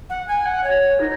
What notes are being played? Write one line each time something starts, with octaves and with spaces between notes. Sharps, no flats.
F#5
G#5
F#5
C#5
D#4